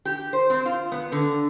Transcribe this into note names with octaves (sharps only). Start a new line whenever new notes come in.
G4
C5
C4
F4
B3
D3